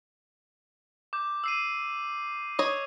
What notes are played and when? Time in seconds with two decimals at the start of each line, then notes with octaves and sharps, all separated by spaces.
1.13 D6 G6
1.44 E6 C7 D#7
2.59 C#5 D#5